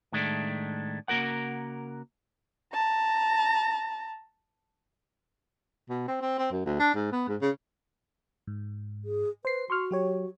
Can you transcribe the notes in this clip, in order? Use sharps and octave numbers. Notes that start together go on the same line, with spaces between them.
A2 D#3 G#3 A3 D4
C#3 A#3 F#4 A#4 F#5
A5 A#5
B2
C4
C4
C4
F#2
D2
D4
G#2
B3
G#2
C#3
G#2
G#4
B4 C5 C7
F#4 C6 C#6 F6
F#3 G4 C#5